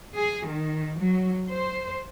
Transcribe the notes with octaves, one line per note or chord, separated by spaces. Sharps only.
G#4
D#3
F#3
C5